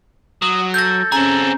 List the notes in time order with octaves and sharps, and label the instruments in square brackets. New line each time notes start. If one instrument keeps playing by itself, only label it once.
[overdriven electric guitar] F#3 [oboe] D#6
[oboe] A4 [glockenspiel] G6 A#6
[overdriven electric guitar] C4 G#4 [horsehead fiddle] C#4 [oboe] A4 [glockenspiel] A#5